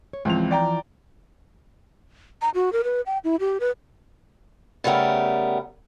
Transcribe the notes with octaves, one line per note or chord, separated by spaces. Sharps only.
C#5
C#2 E3 F3 C4 F7
D5 G5 A#5
A#5
F#4
A#4
B4
G5
E4
G4
B4
C#3 G3 A3 B3 A#4